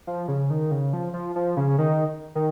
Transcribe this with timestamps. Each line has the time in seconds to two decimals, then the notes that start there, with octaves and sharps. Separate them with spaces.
0.07 F3
0.28 C#3
0.50 D#3
0.71 C#3
0.93 F3
1.14 F3
1.36 F3
1.57 C#3
1.79 D#3
2.35 D#3